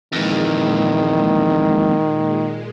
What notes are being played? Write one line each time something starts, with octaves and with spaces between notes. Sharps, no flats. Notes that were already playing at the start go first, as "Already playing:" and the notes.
F2 A#2 D#3 E3 G#3